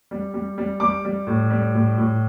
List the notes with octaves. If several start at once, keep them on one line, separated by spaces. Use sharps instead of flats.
G3
G3
G3
G3 D6
G3
A2
G3
A2
A2